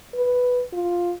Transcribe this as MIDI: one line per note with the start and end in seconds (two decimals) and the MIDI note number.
0.14 0.63 71
0.73 1.14 65